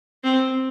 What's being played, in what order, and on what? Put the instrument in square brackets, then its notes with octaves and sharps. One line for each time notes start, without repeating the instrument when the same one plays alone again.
[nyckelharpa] C4